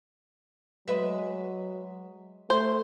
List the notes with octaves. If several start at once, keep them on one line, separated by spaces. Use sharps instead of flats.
F#3 G#3 B4 E5
A3 C5